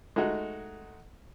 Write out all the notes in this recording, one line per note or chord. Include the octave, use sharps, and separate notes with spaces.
G#3 A3 D#4 F#4